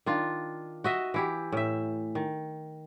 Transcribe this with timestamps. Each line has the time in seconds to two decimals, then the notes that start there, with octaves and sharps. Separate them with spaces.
0.06 D#3 D4 F4
0.84 F#4 D#5 E5
1.14 E3 E4 G4
1.52 A2 E5
2.15 D#3